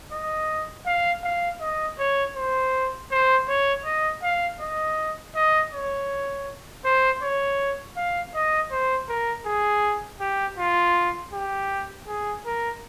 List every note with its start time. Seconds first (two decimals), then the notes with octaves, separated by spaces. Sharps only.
0.12 D#5
0.86 F5
1.24 F5
1.61 D#5
1.98 C#5
2.36 C5
3.11 C5
3.48 C#5
3.85 D#5
4.23 F5
4.60 D#5
5.35 D#5
5.73 C#5
6.85 C5
7.22 C#5
7.97 F5
8.34 D#5
8.71 C5
9.09 A#4
9.46 G#4
10.20 G4
10.58 F4
11.33 G4
12.07 G#4
12.45 A#4